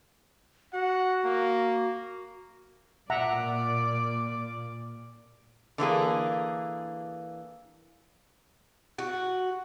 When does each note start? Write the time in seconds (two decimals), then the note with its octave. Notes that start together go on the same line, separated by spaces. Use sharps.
0.73 F#4 F#5
1.24 A#3
3.10 A#2 D5 E5 F#5 A#5
5.78 D3 E3 A#3 G#4
8.99 F#4